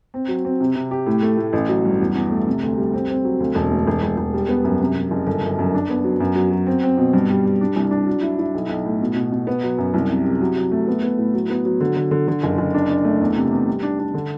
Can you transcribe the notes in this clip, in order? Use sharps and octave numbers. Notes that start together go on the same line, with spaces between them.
C4
F#3
C4
C3
C3
G4
A2
A3
A2
A1
F#3
G2
E2
E2
A3
C3
D2
G3
C4
C4
F#3
D2
E1
A3
E1
E1
E1
G3
B3
F#2
C3
C3
F#1
G1
F#2
F#2
D4
B3
F#3
F#2
F#3
F#3
C4
C4
B2
G2
G3
G3
D4
C2
D4
F#3
E4
E4
B1
B1
A2
B2
B2
B2
B3
F#3
F#2
C2
C3
C3
F#3
F#3
A3
B3
B3
A2
F#3
B3
F#3
D3
D3
D3
D3
F#1
F#1
D4
D4
A3
E2
C3
E2
G3
D4
D4
D3